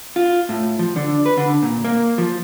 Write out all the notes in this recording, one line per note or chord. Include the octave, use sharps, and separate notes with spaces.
F4
A2
F3
D3
B4
D3
A#2
A#3
F3